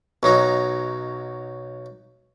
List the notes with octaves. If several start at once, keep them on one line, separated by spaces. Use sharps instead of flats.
B1 F#3 D#4